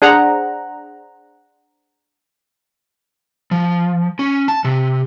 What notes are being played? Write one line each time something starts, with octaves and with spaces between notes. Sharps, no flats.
D4 G#4 C5 F#5 A#5
F3
C#4
A5
C3